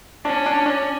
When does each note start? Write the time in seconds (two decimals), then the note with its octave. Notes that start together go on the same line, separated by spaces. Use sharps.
0.25 C#4 D4
0.46 D4
0.66 D4